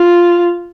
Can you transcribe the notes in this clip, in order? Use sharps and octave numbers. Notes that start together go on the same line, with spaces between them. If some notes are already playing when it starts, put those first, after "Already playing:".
Already playing: F4